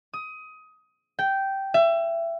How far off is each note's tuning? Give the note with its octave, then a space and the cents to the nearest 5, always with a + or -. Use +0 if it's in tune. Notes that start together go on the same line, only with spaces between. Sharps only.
D#6 +20
G5 -10
E5 +25